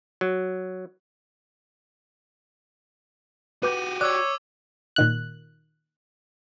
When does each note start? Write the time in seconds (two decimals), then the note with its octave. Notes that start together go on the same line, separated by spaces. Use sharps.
0.21 F#3
3.63 F#4 G4 B4 D6 G6 D#7
4.01 C#5 D5 D6 E6 F#6 G#6
4.96 A#2 D#3 F#6